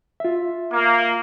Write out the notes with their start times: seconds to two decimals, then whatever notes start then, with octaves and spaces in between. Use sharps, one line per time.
0.20 F4 E5
0.72 A#3